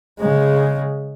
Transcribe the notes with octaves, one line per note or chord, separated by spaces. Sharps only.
C#3 G#3